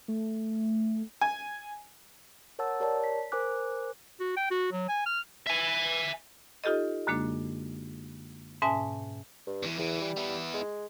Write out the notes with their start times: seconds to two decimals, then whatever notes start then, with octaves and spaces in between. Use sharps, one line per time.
0.08 A3
1.21 G#5
2.59 A#4 C#5 F#5 A5 E6 A6
2.80 G4 A#4 C#5 D5 A5
3.04 B6
3.32 A#4 C5 G#5 D6 F#6
4.20 F#4
4.37 G5
4.51 F#4
4.72 F#3
4.89 G#5
5.06 F6
5.46 E5 G#5
6.64 D#4 F4 G4 A4 D#5
7.07 F#2 D3 G#3 A#3 D4
8.62 G#2 B2 C#4 E5 G#5 A5
9.47 G2
9.63 E2 E3
9.78 E2 E3
10.01 G3
10.17 B3 E4
10.54 G#3